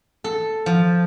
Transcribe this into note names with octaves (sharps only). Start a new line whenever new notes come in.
A4
F3